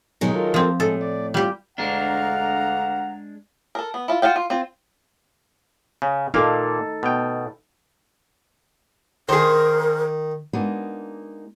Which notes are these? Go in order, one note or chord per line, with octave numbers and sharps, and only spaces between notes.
B2 D#3 F#3 G#3 D#4 G#4
F4 A4 A#4
F3 C4
A2 G#3 A4
D5
G3 F4 G4 G5
D2 G#3 D4 F5 F#5 A#5
A4 A#4
B3
E4 F4
F4 F#4 F5 G5
F4
C4 F4
C#3
A#2 A#3 D#4 A4 F5
B2 G5
D#3 G#4 A#4 C5
G#3 A#3 B3 D4 D#4 F#4